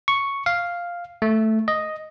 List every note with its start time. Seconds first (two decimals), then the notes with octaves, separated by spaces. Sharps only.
0.08 C#6
0.46 F5
1.22 A3
1.68 D#5